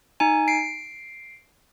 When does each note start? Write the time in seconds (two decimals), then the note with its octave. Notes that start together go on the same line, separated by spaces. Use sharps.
0.20 D#4 G#5
0.48 C7 D7